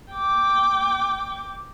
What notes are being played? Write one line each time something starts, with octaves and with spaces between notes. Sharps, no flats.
G5 D6